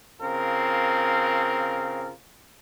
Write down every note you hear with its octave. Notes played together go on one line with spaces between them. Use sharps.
C#3 C4 F4 A#4